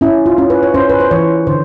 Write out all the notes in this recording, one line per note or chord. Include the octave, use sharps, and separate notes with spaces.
C#4 E4
F4
C#4
B4
C#5
C#4 C5
B4
C5
E3 C#5
D3 C5